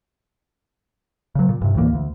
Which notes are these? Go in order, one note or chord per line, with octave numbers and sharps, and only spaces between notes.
C#3 F#3
A#2
G2 C3
D2 A2 E3 A#3
D2